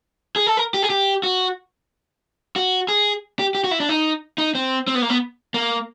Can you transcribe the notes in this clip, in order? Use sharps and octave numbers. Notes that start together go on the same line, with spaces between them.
G#4
A4
A#4
G4
G#4
G4
F#4
F#4
G#4
G4
G4
F#4
E4
D4
D#4
D#4
C4
C4
B3
A#3
B3
A#3